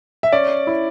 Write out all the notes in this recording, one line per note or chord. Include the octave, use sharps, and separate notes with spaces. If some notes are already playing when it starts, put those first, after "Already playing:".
E5
C#4 D5
E4